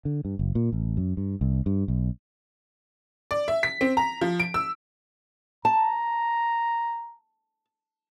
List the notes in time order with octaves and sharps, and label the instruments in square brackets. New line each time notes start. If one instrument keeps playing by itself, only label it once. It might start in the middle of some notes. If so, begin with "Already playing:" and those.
[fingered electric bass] D3
G2
F#1
A#2
A1
F#2
G2
C2
G2
B1
[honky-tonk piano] D5
E5
B6
C4
A#5
F3
D7
E6
[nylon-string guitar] A5 [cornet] A#5